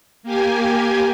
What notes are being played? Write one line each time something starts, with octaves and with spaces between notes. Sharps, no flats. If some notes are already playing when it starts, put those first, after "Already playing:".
A#3 G4 G#5